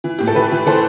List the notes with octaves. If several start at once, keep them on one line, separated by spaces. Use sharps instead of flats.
E3
A2 G4
A4
E3 G4 B4
E3
E3 A4 C5